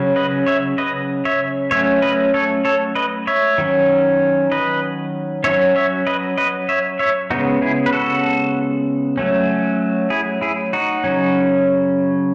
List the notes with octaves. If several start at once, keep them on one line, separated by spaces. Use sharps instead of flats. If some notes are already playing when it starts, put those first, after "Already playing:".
Already playing: C#3 F#3 C#4
B4 D#5
C#5 E5
B4 D#5
C#5 E5
F#3 A3 C#4 C#5 E5
B4 D#5
A4 C#5
A4 C#5
B4 D#5
C#5 E5
D#3 F#3 C#4
B4 D#5
F#3 C#4 C#5 E5
C#5 E5
B4 D#5
B4 D#5
C#5 E5
C#5 E5
C#3 G#3 B3 D#4 F#4
E4 G#4
B4
F#4 A4
F#3 A3 C#4
E4 G#4
E4 G#4
D#4 F#4
C#3 F#3 C#4